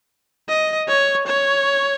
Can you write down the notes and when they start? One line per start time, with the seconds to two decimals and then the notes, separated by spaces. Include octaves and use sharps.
0.49 D#5
0.88 C#5
1.27 C#5